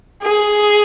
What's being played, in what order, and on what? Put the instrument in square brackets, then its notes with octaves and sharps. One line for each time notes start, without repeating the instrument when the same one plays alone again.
[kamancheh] G#4